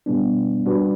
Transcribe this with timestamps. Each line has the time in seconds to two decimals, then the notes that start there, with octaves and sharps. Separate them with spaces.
0.06 B2 G3 B3 D4
0.66 G3 D4 F#4 B4